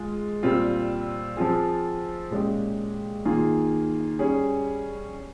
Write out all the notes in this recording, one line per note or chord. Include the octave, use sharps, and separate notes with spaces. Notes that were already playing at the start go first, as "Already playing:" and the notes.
Already playing: G#3 F4 G#4
A#2 G3 C4 F4
F3 C4 F4 G#4
A#2 G#3 C#4 G4
D#3 A#3 F4 G#4
G3 C#4 G#4